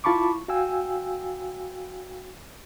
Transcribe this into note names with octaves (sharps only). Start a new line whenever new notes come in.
E4 F4 A5 B5 C#6 D6
F#4 F5 G5 G#5 E6